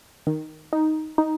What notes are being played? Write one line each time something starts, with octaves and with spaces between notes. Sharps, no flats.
D#3
D#4
D#4